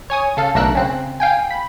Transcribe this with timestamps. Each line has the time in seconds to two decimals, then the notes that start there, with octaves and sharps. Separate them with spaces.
0.10 C#5 G#5 D#6
0.37 C#3 A4 F5
0.55 B1 A3 D4 A#4 E6 F#6
0.75 C#3 C4 F#6
1.20 F5 G5 G#5
1.51 B5